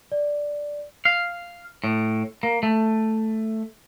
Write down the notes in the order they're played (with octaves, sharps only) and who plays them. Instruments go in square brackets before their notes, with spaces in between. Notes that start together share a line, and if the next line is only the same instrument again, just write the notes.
[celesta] D5
[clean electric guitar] F5
A2
A#3
A3